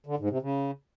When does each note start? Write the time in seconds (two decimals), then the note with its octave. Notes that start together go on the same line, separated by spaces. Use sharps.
0.06 D3
0.18 G#2
0.30 C3
0.42 C#3